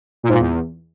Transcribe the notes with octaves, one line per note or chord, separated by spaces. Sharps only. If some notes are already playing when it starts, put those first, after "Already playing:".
A#2
G#2
A#2
E2